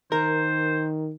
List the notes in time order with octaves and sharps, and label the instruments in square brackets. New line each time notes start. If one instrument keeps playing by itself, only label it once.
[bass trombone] D#3 [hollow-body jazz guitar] A#4 [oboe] C5